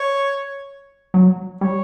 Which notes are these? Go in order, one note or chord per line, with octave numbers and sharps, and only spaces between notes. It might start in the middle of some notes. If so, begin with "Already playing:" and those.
Already playing: C#5
F#3
G3 C#5